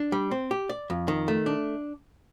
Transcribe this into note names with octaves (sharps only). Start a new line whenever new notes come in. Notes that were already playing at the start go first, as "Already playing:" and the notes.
Already playing: D4
G3
C4
G4
D5
F2
D#3
A3
D4